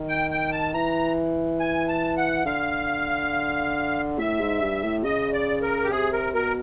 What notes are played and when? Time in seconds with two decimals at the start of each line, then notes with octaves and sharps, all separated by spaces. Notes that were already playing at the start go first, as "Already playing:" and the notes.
Already playing: D#3
0.09 G5
0.31 G5
0.52 A5
0.74 E3 A#5
1.60 G#5
1.88 A5
2.17 F#5
2.45 D3 F5
4.19 A2 E5
4.40 G#2
4.61 G2
4.84 A2
5.04 C#3 D#5
5.33 D5
5.62 A#4
5.84 G4
5.91 C3 G#4
6.13 A#4
6.34 B2 A#4